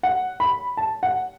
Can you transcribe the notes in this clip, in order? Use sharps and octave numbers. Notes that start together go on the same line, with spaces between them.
F#5
B5
A5
F#5